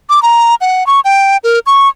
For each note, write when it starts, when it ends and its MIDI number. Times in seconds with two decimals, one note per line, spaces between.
0.10 0.22 86
0.22 0.55 82
0.61 0.86 78
0.87 1.00 85
1.05 1.37 79
1.44 1.59 70
1.66 1.88 85